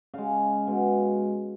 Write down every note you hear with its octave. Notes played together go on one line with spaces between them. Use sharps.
C#3 G#3 F5
B2 G#3